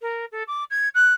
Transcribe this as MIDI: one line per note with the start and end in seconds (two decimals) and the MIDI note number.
0.02 0.25 70
0.32 0.43 69
0.47 0.64 86
0.70 0.89 92
0.94 1.13 90